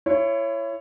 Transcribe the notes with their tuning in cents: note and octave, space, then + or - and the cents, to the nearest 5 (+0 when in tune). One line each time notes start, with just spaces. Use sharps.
E4 +30 C#5 +0